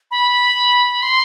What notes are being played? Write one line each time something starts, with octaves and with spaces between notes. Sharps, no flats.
B5
C6